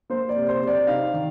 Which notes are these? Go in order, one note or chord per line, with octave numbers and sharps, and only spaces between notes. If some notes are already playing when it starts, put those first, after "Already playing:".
A#3 C5
D5
C3
C5
C3
D5
D#4 F5
D#3